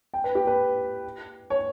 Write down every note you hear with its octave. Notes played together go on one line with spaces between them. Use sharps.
G5
B4
G4
B4
C#5